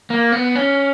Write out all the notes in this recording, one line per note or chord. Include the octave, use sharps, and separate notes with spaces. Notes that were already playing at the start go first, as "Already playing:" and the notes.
A#3
B3
C#4